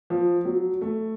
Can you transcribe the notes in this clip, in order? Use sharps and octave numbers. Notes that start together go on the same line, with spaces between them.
F3
F#3
A3